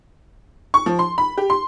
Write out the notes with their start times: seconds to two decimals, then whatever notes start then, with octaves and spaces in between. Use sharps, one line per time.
0.74 C#6
0.86 F3
0.99 C6
1.18 B5
1.38 G4
1.50 C6